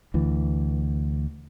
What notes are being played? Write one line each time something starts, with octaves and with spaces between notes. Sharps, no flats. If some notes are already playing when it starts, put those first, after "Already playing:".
D2 E3